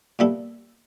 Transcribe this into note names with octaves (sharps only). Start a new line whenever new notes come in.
A#2 G3 B3 E4 A4